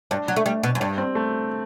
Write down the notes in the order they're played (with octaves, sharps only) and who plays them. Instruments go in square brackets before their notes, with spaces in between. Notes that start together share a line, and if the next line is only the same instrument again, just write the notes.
[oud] G2 [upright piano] D4
[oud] F#3
A3
G3
B2
F#2
[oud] G2 [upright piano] D4
[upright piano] C4
A3